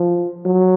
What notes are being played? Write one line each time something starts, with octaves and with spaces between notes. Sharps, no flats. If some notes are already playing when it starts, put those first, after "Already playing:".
Already playing: F3
F#3